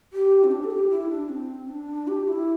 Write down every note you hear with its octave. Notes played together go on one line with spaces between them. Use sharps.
G4
C4
D4
A4
G4
E4
D4
C4
D4
G4
E4